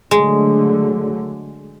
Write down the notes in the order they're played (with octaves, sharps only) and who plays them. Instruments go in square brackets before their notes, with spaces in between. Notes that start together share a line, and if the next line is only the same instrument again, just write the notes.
[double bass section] D3 F#3 A3 [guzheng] G#3